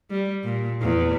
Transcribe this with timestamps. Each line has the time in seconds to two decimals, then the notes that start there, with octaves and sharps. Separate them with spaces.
0.11 G3
0.44 A#2
0.82 E2